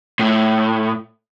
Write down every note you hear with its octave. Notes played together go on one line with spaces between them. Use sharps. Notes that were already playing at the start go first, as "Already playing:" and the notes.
A2